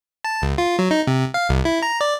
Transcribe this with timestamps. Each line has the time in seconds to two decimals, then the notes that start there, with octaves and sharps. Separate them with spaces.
0.25 A5
0.42 C#2
0.58 F4
0.79 F#3
0.91 D#4
1.07 C3
1.34 F5
1.49 C2
1.65 E4
1.82 A#5
2.01 D5